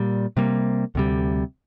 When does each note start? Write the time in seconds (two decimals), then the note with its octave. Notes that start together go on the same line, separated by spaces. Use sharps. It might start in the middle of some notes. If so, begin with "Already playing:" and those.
Already playing: A#2 G3
0.37 C3 G3 A#3
0.95 D2 C3 G3